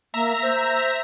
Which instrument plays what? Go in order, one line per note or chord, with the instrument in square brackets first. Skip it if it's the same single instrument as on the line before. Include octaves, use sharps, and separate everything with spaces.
[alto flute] A#3 [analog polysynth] E5 A#5
[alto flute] C5